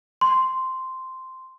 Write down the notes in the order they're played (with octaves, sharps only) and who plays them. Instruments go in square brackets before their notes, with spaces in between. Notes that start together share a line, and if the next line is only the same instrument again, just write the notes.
[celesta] C6